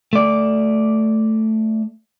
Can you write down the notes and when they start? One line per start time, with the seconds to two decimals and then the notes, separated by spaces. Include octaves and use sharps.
0.13 A3 D5